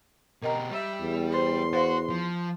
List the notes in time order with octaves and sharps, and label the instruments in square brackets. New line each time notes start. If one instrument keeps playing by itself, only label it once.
[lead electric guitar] B2 G4 [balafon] A#4 D#5 A#5
[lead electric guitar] G3 [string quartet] E5
[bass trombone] E2
[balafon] B4 C5 [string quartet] C6
[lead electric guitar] F#4 [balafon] C5 F5
[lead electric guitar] F3